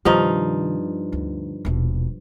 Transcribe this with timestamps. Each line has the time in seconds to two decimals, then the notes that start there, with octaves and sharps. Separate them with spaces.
0.05 G2 C3 D#3 F3 D#4
1.12 D2
1.65 D#1 B2